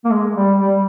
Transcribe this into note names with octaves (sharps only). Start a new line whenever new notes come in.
A#3
G#3
G3
G3